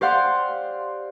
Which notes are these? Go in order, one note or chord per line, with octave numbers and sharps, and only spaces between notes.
G4 C5 D5 F5 F#5 C6